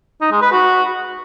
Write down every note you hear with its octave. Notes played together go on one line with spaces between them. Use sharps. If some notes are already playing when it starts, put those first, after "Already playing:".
D#4
G#3
B4
F#4